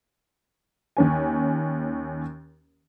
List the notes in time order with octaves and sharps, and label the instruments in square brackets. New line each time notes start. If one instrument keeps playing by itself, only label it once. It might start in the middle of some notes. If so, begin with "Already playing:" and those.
[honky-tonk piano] D#2 C#4 G#5